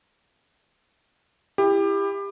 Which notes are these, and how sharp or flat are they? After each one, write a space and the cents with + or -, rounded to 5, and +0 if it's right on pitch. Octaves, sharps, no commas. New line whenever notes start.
E4 +15 G4 +25